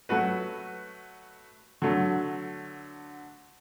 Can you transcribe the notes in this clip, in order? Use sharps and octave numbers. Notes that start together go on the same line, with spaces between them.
F#3 A3 F#4 B4
D3 F#3 A3